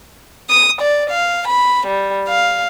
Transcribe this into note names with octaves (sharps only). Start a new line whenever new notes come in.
D#6
D5
F5
B5
G3
F5